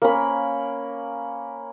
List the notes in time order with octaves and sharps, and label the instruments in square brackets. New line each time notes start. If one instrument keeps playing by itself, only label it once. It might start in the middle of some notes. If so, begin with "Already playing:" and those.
[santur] A#3 C#4 B5